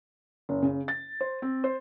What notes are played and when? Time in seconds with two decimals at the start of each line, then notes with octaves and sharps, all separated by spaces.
0.49 F#1
0.62 C#3
0.88 A6
1.21 C5
1.42 C4
1.64 C5